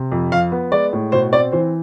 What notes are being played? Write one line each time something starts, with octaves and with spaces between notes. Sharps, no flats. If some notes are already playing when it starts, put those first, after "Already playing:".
Already playing: C3
F2
F3 F5
B3
G#3 D5
A2
B2 C5
C4 D5
E3 C5